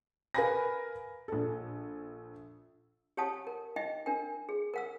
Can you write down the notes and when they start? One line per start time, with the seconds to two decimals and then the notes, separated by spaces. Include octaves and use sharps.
0.34 A#4 B4 F5 G#5 B5 A#6
1.28 A#1 A4
3.17 G4 C#5 F#5 A5 D#6
3.47 A#4
3.76 D#4 D#5 E5 G5
4.06 D4 A#4 G5
4.49 G#4
4.74 A#4 F#5 E6